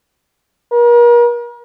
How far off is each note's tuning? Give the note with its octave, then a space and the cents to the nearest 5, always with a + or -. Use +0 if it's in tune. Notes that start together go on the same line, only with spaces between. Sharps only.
A#4 +40